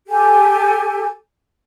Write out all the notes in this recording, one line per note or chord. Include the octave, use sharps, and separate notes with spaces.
G4 A4 G#5